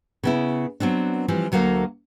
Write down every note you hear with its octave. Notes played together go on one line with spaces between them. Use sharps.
C#3 B3 E4
F#3 B3 C4 D4
E3 F3 G3 C4
D2 F#3 A3 A#3 F5